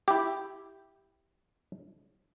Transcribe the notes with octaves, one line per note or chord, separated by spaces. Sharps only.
E4 G4